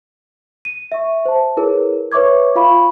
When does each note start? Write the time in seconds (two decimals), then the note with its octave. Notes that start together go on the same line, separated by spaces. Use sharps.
0.65 D#7
0.92 E5 C#6
1.25 C5 A5
1.57 E4 G#4 A#4 B4 C#5
2.12 B4 C#5 E5 C#6 D6 G#6
2.55 F4 F5 B5 C#6